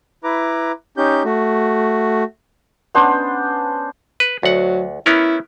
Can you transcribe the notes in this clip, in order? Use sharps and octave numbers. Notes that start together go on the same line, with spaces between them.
E4 B4 A#5 D6
C#4 D#4 G4 G6
A3 F#4
B3 C#4 D4 C5
B4
D2 F#3 F#5
B3 C#4 E4 A#4